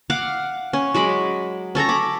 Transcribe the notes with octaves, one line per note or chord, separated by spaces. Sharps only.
F5 F#5 D6
C#4
F#3 G#3 B5 D6
C#4 A4 C#5 A#5
B5 D6